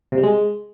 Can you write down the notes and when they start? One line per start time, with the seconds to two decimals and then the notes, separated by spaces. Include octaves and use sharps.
0.12 C3
0.18 G3
0.23 G#3